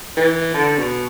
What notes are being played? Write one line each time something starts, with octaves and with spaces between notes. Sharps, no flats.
E3
D3
B2